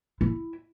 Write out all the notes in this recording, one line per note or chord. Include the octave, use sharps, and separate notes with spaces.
E4